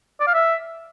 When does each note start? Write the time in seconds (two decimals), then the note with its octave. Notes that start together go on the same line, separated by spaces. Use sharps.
0.20 D5
0.27 F5
0.34 E5